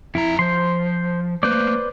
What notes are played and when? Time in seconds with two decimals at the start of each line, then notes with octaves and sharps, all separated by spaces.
0.15 F2 E4 A#5
0.39 F3 C5 C6
1.43 A3 A#3 B4 C5 D5